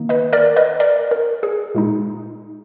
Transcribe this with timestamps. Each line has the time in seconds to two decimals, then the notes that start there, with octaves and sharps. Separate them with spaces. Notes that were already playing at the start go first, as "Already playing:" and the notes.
Already playing: D#3 A#3 D#4
0.09 B4 D#5
0.33 A#4 D5
0.56 B4 D#5
0.80 A#4 D5
1.11 A#4
1.43 G#4
1.75 A#2 G#3 D#4